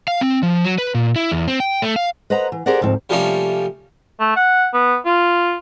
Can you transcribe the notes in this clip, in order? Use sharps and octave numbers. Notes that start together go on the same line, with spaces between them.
F5
C4
F3
F#3
B4
A#2
E4
E2
C4
G5
A3
F5
B4 C5 D#5 F#5 A#5
E3
G4 G#4 A#4 C5 D5 F#5
D2 G#2 F3 C4
C3 F3 G3 A3 A#3 C#4
A3
F#5
B3
F4